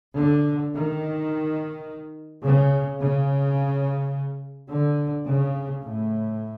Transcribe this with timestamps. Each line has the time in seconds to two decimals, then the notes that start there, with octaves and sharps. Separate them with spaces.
0.18 D3
0.74 D#3
2.45 C#3
3.01 C#3
4.71 D3
5.28 C#3
5.84 A2